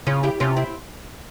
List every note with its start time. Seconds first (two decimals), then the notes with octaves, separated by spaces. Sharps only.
0.07 C#3 C#4 F4
0.23 E4 G4
0.40 C3 C#4 F4
0.56 C4 E4